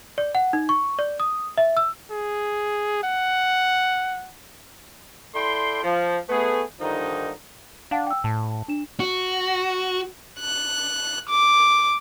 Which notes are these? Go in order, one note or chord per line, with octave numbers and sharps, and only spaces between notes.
D5
F#5
D#4
C#6
D5
D#6
E5
E6
G#4
F#5
E4 A4 D5 G5 C6
F3
A3 B3 G#4
G2 D3 D#3 F3 D#4
D4 F5 F#5 A5
G5 E6
A2 A5
D4 E7
F#4
F#6
D6